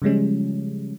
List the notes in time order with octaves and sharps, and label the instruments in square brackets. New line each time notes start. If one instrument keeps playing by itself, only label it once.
[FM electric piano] C#3 F3 G3 G#3 C#4